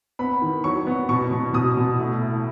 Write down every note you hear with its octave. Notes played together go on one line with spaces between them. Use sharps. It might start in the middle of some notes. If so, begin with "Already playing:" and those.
B3 B5
D#3
F#3 C#6
B3
B2 C#6
B2
B2 D#6
B2
A3
A2